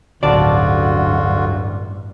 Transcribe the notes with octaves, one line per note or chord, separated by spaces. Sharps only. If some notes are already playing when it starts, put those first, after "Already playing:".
D1 A1 G2 D3 F4 F#4 D5 A5